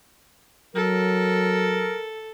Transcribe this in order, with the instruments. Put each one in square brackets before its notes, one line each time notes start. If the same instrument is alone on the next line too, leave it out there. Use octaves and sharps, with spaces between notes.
[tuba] F#3 [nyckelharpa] A4 [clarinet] A#4